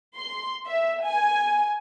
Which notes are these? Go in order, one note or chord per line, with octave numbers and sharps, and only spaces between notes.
C6
E5
G#5